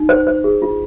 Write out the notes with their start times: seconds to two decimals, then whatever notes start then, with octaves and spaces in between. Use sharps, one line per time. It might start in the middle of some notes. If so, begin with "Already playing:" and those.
Already playing: D#4
0.09 C5
0.27 C5
0.44 G#4
0.62 F4